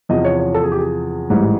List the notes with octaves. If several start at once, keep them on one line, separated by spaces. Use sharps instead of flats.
E2 C3 F3 D#5
C#5
C#5
A4
G#4
G4
G#4
A1 G#2 E3 G3